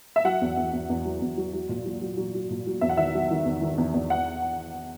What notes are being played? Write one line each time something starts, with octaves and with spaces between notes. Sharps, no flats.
E5
F#3 F#5
E2
E2
E2
E2
F#3
E2
F#3
F#3
A#2
F#3
F#3
F#3
F#3
A#2
F#3
E2 E5
F#5
D#3 E5
F#3
D#3
E2
D#3
E2
E2
F#5